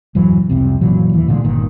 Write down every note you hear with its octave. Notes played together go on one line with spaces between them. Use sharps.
D#1 F#2 E3 F#3
C2 F2 C3
F#1 A#2 E3 F#3
D1 D#2 E3
A#2 D3 D#3 G#3
G1 A#2 D#3